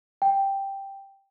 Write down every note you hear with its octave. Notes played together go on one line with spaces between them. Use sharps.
G5